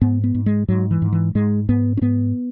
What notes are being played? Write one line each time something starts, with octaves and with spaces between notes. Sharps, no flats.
G#2 B3
B3
G#2
G#3
G#2 F#3
E3
G#2
E3
G#2 G#3
G#2 B3
C#4
G#2 B3